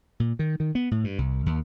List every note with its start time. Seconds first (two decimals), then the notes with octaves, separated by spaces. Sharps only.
0.20 A#2
0.39 D#3
0.60 D#3
0.75 B3
0.91 A2
1.04 G2
1.18 C2
1.46 D#2